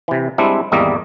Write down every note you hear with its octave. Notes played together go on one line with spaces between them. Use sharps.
C3 E3
G3 G#3 C4 D4 E4
G#1 E2 G3 A#3 D#5 E5